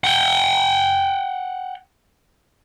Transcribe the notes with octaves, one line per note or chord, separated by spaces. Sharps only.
F#5 G5